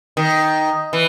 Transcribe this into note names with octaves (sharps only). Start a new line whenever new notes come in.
D#3
E3